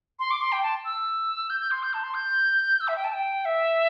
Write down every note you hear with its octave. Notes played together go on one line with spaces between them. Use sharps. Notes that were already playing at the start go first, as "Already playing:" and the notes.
C6
D6
C6
G5
A5
E6
G6
G6
C6
G6
A5
C6
G6
E6
E5
G5
A5
G5
E5